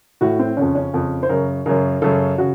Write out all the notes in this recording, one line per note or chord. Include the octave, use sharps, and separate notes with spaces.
A2 F#4
C4
F2 C#3 C#4
C#4
F2 C#3
C5
F#2 C#3 A#4
F#2 C#3 A#4
F#2 C#3 A4
C#3 F#4